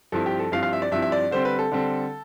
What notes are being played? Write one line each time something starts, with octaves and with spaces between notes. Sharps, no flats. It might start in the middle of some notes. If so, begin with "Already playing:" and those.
G2 F3 C4 E4 A4
G4
A4
G2 F3 C4 E4 F5
F5
E5
D5
G2 F3 C4 E4 E5
E5
D5
D3 G3 C4 C5
B4
A4
D3 G3 C4